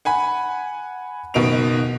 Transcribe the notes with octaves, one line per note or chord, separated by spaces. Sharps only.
F#5 G#5 B5
F#1 B2 D#3 D#4 D7 F7